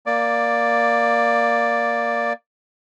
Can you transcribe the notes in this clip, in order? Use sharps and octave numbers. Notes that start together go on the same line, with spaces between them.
A#3 D5